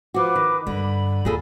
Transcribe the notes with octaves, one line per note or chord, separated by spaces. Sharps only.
F3 F#4 B4 D6
D#3
G2 D3 B5
D#2 A#2 G#4 A4